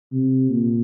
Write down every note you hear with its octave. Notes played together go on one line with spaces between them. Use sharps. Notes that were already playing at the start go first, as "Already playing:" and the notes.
C3
A#2